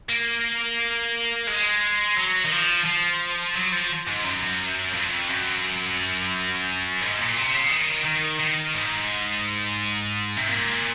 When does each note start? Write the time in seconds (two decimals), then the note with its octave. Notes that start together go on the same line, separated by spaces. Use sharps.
0.09 A#3
1.47 G#3
2.17 F#3
2.45 D#3
2.52 F3
2.85 F3
3.56 F#3
3.72 F3
4.07 G#2
4.24 F#2
4.94 F2
5.29 F#2
7.02 G#2
7.19 A#2
7.37 C3
7.54 C#3
7.71 D#3
8.05 D#3
8.40 D#3
8.75 G#2
10.37 C3
10.48 A#2